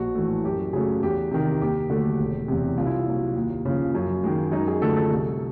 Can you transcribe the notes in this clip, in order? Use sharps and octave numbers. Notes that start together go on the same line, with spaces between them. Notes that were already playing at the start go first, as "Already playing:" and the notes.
Already playing: A#1 F#4
A2 E3 A3
F#2 G4
C#3 F#3 A3 G#4
E2 G4
C3 D#3
D#2 G4
D3 F#3 A3
E1
E2 C3
C2 F4
E4
F4
A#2 F#3
D#2
C#3 F3
F#2
D#3 G#3
F#2 D#4
G#4
D3 F3 A3 A4
A4
C2